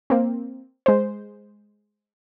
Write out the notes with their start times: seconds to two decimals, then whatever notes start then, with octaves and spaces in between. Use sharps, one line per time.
0.10 A#3 C4
0.86 G#3 C5